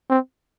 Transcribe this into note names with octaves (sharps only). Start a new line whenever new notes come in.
C4